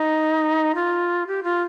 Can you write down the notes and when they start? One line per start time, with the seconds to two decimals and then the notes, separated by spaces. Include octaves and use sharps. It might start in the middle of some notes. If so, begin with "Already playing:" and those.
Already playing: D#4
0.75 F4
1.27 G4
1.44 F4